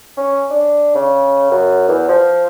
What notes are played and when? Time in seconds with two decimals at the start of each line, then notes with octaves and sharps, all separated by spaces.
0.17 C#4
0.50 D4
0.95 C#3
1.51 F#2
1.89 E2
2.09 F3